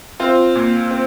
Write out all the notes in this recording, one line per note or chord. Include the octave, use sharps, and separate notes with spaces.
C4 F4
A#2
C4